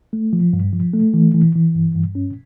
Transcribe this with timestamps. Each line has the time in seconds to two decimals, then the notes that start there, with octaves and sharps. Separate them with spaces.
0.13 A3
0.33 F3
0.53 G2
0.73 F3
0.93 A3
1.14 E3
1.34 E3
1.55 E3
1.75 G2
1.95 G2
2.15 C#4